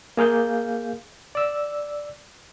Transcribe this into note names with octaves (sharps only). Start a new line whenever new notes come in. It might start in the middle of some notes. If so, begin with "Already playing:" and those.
A#3 G#4 F5 G6
D5 E6